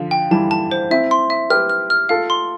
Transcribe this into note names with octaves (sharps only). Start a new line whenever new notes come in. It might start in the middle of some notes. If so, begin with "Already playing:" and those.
Already playing: D3 F3
G5
E3 G3 A5
A5
C5
C4 E4 E5
C6
E5
G4 B4 F6
F6
F6
F4 A4 F5
C6